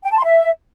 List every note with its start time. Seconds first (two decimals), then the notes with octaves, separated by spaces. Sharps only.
0.04 G5
0.11 A5
0.17 C6
0.24 E5